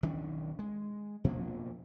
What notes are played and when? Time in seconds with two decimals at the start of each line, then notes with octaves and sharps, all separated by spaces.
0.03 B1 D#3 C#4 D4
0.59 G#3
1.24 B2 F3 A#3 D4